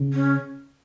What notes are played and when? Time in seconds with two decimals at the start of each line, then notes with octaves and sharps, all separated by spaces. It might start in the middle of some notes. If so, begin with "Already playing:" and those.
Already playing: C#3
0.13 C#4